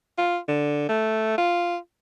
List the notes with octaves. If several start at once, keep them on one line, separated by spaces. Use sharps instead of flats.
F4
D3
A3
F4